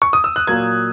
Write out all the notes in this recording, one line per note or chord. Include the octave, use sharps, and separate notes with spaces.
C#6
D#6
E6
F#6
A#2 F#3 A#3 G#6